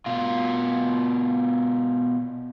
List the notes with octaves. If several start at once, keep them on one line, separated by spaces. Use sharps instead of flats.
B2 F4